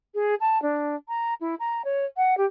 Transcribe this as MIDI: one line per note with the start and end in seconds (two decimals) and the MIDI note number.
0.15 0.35 68
0.40 0.61 81
0.62 0.96 62
1.08 1.34 82
1.41 1.55 64
1.60 1.82 82
1.85 2.05 73
2.17 2.37 78
2.37 2.46 67